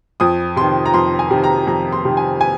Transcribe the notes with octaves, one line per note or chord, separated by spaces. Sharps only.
F2 D#6
C3 D#3 C6
A#5
F2 C6
G#5
C3 D#3
A#5
F2 A#5
C6
C3 D#3
G#5
G#5